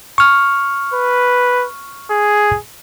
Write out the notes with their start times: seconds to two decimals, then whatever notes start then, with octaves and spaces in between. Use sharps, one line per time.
0.18 C#6 F6
0.94 B4
2.10 G#4